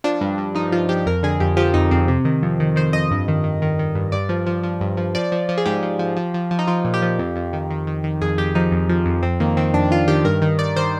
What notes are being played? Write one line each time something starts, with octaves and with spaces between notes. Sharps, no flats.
F3 D4
G2
G2
F3 D#4
F3 F4
F3 G4
F2 A#4
D3 G#4
F2 G4
F3 G4
F2 D#4
F2 C4
C3
D#3
F2
D#3
D#3 C5
F2 D#5
G2
D#3
D#3
D#3
D#3
G2
G2 D5
F3
F3
F3
G2
F3
F3 D5
F3
F3
G#4
G#2 G4
F3
F3
F3
F3
F3
D#4
F3 F4
A#2
G4
F3
F2
F2
D#3
D#3
D#3
D#3
F2 G#4
F2 G4
F3 D#4
F2
F3
F2
F2 C4
D#3 A#3
D#3 C4
F2 D4
D#3 F4
D#3 G4
G2 A#4
D#3
D#3 D5
D#3 C5